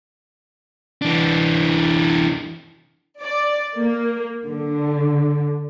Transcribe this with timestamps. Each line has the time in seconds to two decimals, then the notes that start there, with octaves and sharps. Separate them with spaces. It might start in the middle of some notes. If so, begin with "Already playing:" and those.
1.02 E3 D4
3.20 D5
3.77 A#3
4.46 D3